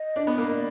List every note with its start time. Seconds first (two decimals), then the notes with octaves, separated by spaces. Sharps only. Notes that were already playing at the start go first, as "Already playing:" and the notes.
Already playing: D#5
0.16 D4
0.27 B3
0.38 A#3
0.50 D#5
0.54 D5